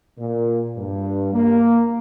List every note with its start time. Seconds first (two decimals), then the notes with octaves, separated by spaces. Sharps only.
0.18 A#2
0.76 G2
1.33 A#3